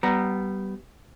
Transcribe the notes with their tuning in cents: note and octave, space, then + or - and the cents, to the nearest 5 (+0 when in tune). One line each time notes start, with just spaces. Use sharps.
G3 -20 B3 +0 A#5 +0